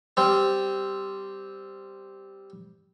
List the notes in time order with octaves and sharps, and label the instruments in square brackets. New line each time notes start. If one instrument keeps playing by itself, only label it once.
[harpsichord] G3 C4